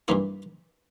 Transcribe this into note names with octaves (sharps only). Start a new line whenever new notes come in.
G2 E3 A#3 E4